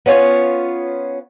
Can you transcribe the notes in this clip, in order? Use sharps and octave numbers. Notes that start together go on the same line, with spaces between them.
B3 C#4 F4 C#5